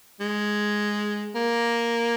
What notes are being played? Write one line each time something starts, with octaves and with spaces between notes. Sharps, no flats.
G#3
A#3